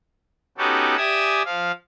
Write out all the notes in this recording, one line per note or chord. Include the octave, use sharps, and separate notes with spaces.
B3 C#4 D#4 F#4 G4 A4
G4 D5 E5 G#5 D#6 E6
F3 F5